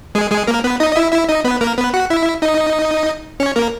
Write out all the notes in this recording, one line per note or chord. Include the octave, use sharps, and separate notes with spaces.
G#3 G#4
G#3 G#4
A#3 A#4
B3 B4
D#4 D#5
D#5
E4 E5
E4 E5
D#4 D#5
B3 B4
A#3 A#4
B3 B4
F#4 F#5
E4 E5
D#4 D#5
C#4 C#5
A#3 A#4